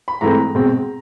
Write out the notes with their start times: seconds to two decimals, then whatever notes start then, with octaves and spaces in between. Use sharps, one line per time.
0.08 B5
0.21 G#2 E3 A3 C4 A#5
0.55 B2 G#3 C4